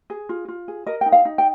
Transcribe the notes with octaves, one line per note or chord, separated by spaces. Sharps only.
G#4
F4
F4
G#4
A#4 D#5
D#4 G5
F5
D#4
G5